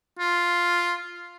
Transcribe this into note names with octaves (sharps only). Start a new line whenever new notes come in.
F4